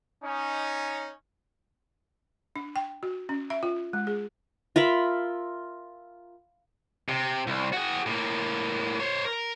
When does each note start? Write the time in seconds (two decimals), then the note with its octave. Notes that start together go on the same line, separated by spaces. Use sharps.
0.23 C#4 D#4
2.56 D4
2.76 G5
3.03 F#4
3.29 C#4
3.50 E5
3.63 F4
3.93 G#3
4.07 G#4
4.76 F4 A#4 E5 B5
7.09 C3
7.47 C2
7.73 F#4 G#4
8.06 A2 A#3
9.00 C5 C#5
9.25 A#4